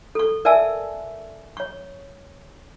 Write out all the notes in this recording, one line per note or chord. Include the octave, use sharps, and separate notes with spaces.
A4 C#6
A#4 D5 E5 G#5 A5 E6
C#5 C#6